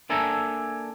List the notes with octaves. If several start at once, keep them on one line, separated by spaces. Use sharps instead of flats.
A#3 D4 A4 E5 G#5 A#5